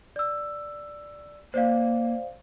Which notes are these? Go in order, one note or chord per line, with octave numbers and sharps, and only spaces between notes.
D5 E6
A#3 C5 D5 F5